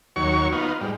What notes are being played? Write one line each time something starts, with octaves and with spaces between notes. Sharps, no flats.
D#2 F#3 C#5 C#6
B3 D#4 F4
G#2 G3